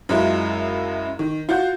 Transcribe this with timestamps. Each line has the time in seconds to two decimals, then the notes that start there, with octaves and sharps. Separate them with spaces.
0.09 F#2 F#3 G#3 E4 F4
1.19 D#3
1.49 F4 F#4 G6